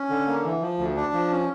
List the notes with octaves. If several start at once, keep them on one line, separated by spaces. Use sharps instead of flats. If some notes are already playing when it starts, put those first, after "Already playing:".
Already playing: C#4
D3
A#3
E3
F3
D2
D4
F3
C#4